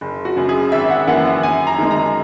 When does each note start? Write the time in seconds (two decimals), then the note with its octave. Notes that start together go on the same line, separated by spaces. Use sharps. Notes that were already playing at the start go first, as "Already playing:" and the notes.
0.01 F#1
0.25 F#4
0.37 F#2 C#3
0.49 G#4
0.72 G#1 E5
0.90 F#5
1.07 F#2 E3 A#3 F#5
1.25 F#5
1.43 F#2 G#5
1.67 A#5
1.78 D#3 G#3
1.91 A#5